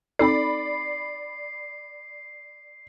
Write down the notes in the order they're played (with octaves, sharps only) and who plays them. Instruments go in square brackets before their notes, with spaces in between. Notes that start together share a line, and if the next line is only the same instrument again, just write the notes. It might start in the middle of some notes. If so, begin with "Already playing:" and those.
[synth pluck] C4 D#4 A4 [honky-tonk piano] D5 B5 [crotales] C7